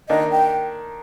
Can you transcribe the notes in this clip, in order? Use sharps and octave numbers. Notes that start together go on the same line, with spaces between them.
D#3 A#3 D4 D#5
G5